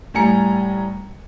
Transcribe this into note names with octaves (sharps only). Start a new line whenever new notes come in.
A2 G3 G#5 A#5 C#7